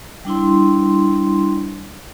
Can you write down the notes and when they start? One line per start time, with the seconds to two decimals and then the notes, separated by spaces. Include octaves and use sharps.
0.25 G3 D4 E4 C6